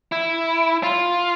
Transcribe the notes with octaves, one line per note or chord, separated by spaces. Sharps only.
E4
F4